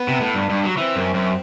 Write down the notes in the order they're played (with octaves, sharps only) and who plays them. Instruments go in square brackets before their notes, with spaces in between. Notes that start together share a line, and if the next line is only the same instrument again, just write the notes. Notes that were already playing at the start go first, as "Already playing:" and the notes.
Already playing: [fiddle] B3
[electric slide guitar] C3
A2
G2
G2
F#3
[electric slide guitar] E3 [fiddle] C4
[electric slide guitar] F#2
F#2